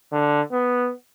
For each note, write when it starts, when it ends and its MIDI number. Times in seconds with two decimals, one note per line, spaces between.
0.12 0.41 50
0.52 0.92 59